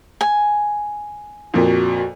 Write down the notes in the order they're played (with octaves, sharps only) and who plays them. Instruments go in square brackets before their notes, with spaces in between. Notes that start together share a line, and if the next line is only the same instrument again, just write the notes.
[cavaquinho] G#5
[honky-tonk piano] F2 A#2 [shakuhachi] F#4